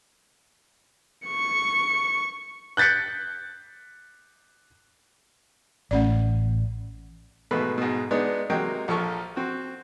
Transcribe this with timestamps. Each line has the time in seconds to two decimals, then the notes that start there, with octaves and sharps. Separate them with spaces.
1.27 C#6 C#7
2.77 F#6 G6 A6 B6 C#7
5.91 A1 A3 C#4 D5
7.51 G#2 B2 A3 B4 B5
7.78 G#2 B2
8.11 G#3 B3 D4 D#4
8.50 C3 F#3 G#3 A#3 D#5 G5
8.88 A#1 F3 A4 C#6
9.36 C4 F#4